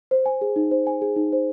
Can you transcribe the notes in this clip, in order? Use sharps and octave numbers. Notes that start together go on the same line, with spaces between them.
C5
G#5
G#4
D#4
C5
G#5
G#4
D#4
C5